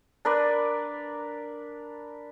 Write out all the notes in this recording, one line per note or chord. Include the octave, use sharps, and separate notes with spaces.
D4 A#4 B4 D5